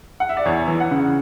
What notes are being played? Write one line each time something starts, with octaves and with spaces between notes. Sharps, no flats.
F#5
E5
D5
E2 C#5
E3
F#5
C#3